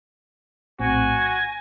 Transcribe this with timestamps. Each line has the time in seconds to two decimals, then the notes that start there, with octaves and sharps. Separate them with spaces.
0.79 A#1 A2 C4 F#4 G#5
1.22 A#6